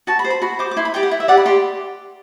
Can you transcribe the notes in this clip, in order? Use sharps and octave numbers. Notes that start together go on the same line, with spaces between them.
F#4 A5
B5
C5
B5
F#4 B5
C5 D6
D6
E4 C6
B5
G4 D5 G5
F#5
E4
E5
G4 D5 F#5
B5
G4 C6